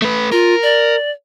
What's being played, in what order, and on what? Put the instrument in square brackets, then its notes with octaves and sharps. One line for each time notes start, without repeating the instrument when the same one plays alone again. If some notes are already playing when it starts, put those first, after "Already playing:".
[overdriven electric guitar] A3 B4
[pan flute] F4 [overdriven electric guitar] A#4
[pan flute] D5